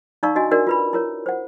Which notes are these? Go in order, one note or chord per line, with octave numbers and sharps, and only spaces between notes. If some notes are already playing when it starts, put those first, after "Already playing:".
D#4 D5 F5 A#5 C#6 E6
D4 F#4 D#5 G#5
D4 F#4 A#4 D5
F4 B4 B5
E4 A#4 C#5
C5 F#5